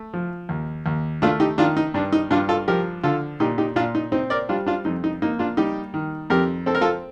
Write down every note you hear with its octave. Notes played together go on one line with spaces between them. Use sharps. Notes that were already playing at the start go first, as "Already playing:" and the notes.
Already playing: A3
F3
D#2
D#2
A3 D4 F4
D#4 G4
D#3 D4 F4
D#4
G2 D4
D#4
G2 D4 F4
F4 A4
F3 G4 A#4
D3 F4 A4
A#2 D#4 G4
D#4 G4
A#2 D4 F4
D#4
C4 D#4
A#4 D5
G3 D4 F4
D4 F4
F2 D#4
D#4
A#3 D#4
D4 F4
G3 D#4 G4
D#3
F2 G4 A#4
C4 A4
A#4
F4 A4